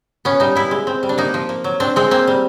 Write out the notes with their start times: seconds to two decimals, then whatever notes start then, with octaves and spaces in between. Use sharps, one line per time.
0.25 B3 C#4
0.40 G3 D#4
0.55 B3 E4
0.71 G#3
0.87 C4
1.03 G3
1.09 D4
1.18 A#3 D#4
1.34 F3
1.49 A#3
1.64 F#3
1.80 C4 D4
1.96 G#3 C4
2.11 A#3 C4
2.27 G3